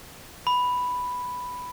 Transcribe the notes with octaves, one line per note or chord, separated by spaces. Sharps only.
B5